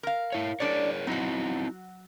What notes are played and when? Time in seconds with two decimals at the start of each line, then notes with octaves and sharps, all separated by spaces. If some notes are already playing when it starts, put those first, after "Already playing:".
0.03 A#4 F5
0.33 E4 C#5
0.60 D4 G#4 A#4 C#5 D5
1.07 F#3 C4 D#4 E4 F#4